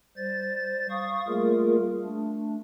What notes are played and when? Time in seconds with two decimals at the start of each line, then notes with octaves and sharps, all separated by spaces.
0.17 G3 C5 A6
0.90 F5 C#6 D#6
1.28 G3 A3 A#3 F4 G#4 A#4
2.04 A3 D4